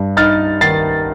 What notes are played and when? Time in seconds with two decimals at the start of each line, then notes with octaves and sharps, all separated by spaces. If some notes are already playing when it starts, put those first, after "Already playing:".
Already playing: G2
0.17 D#4 F6 A6
0.61 D#3 A6 C7